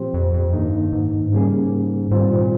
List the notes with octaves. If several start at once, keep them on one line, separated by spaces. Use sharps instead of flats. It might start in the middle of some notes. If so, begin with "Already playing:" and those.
Already playing: A#2 F3 C4 G4 C5
F2
F2
G2 D#3 A#3 D#4
G#2
G2
G#2 C#3 G3 A#3 C#4 G#4
G#2 D#3 G3 C4 F4 C5
A#2